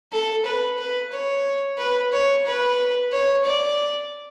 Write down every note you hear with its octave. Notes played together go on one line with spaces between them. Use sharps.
A4
B4
B4
C#5
B4
C#5
B4
C#5
D5